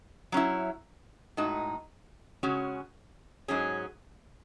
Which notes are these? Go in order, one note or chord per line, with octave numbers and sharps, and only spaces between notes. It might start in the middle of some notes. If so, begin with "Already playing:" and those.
F#3 C#4 E4
A2 G#3 D#4 F#4
C#3 G#3 C#4 F#4
G#2 F#3 C#4 G#4